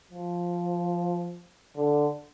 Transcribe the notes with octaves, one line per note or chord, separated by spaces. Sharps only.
F3
D3